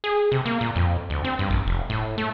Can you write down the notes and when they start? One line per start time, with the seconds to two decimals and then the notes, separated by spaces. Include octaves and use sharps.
0.04 G#4
0.32 C3
0.46 A#3
0.61 A#2
0.76 F2
1.10 D2
1.24 C4
1.39 G2
1.50 A#1
1.67 F1
1.90 A2
2.18 A3